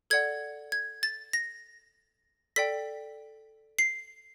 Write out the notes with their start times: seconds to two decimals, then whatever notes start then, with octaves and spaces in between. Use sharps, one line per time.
0.10 A4 D5 F#5 G#6
0.72 G#6
1.03 A6
1.33 A#6
2.56 A4 D5 G5 B6
3.79 C7